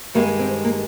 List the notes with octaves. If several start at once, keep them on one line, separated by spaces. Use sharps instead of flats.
G2 D#3 G#3 A#3
C4
A#3